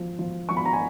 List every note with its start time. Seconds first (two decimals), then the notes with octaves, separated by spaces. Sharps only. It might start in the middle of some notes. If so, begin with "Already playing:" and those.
Already playing: F3
0.19 F3
0.49 F3 C#6
0.57 B5
0.65 A#5
0.73 G#5